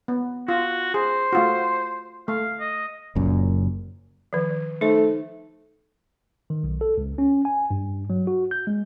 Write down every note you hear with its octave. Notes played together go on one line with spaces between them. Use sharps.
B3
F4 F#4
G#4 C5
A3 F4 F#4
A3 F5
D#5
F#1 F#2 A#2
D#3 F3
A3 D#4 C5
D#3
B1
A4
C#2
C#4
G#5
G2
F#3
F#4
G6
G#3